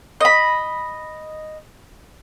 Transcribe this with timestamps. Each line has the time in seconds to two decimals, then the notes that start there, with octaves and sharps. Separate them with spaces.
0.21 D#5 B5